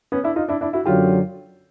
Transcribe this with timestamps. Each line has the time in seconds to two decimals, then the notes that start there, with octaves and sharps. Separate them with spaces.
0.12 B3 C#4
0.24 D4 E4
0.36 D#4 F4
0.48 D4 E4
0.61 D4 E4
0.73 E4 F#4
0.85 F#2 D3 F#3 F4 G4